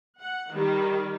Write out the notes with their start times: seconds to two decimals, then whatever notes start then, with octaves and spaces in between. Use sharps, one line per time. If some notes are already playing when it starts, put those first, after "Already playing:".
0.20 F#5
0.53 D#3 G3